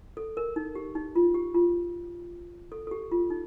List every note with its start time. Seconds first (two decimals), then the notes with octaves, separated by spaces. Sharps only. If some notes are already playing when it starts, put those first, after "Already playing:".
0.17 A4
0.37 A#4
0.56 D#4
0.75 G4
0.95 D#4
1.16 F4
1.34 G4
1.54 F4
2.72 A4
2.87 A4
2.91 G4
3.11 F4
3.30 D#4